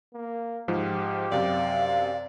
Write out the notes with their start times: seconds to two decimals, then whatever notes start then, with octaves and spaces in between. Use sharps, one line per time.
0.14 A#3
0.68 G#2 F3 G4
1.32 F#2 C3 D5 F5